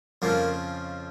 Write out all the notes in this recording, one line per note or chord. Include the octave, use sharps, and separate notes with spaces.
F2 C#3 F3 A#3